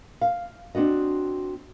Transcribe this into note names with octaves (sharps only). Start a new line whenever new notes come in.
F5
C4 D4 F#4 D#5